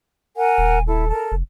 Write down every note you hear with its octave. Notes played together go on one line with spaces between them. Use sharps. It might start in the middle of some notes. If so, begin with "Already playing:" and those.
A#4 F#5 G#5
D#1
E4 A4
A4 A#4
F1